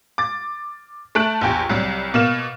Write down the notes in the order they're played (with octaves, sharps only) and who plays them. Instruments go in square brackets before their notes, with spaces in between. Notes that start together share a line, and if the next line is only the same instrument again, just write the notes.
[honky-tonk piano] D6 A6
A3 A5 F#6 D7
A#1 E2 G4 G5
C2 F#3 G3
B2 A#3 F6 E7